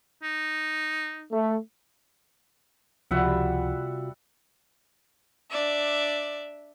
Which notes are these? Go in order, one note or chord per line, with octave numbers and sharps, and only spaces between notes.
D#4
A3
C#2 C3 F3 G3 F4 F#4 E5 F#5
D4 D5 E5